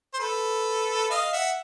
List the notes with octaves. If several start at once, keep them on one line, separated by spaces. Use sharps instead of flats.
C5
A4 B4
D#5 F5
E5 F#5